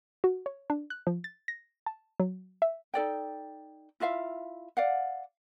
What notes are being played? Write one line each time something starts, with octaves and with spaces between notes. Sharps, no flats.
F#4
C#5
D4
F#6
F3
A6
A#6
A5
F#3
E5
D#4 A4 D5 G5
E4 F4 E5 F5
D5 F5 F#5